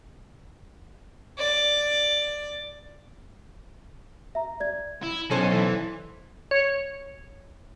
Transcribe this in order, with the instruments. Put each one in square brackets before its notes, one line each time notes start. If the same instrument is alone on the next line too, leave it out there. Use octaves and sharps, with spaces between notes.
[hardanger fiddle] D5
[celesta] E5 A#5
D5 G#6
[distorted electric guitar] E4
[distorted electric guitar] B1 [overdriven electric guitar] C#4 [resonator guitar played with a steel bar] A4 C5
[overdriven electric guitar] E3
[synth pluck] C#5